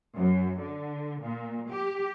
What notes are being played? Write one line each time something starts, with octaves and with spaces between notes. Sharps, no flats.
F#2
D3
A#2
G4